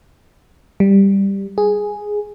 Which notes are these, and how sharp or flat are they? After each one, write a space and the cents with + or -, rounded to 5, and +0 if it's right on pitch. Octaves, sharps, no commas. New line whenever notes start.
G3 +5
G#4 +0